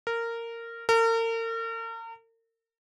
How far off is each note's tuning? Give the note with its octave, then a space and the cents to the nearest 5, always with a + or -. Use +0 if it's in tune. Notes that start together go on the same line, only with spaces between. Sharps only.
A#4 -15
A#4 -40